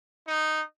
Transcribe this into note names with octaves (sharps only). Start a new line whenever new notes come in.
D#4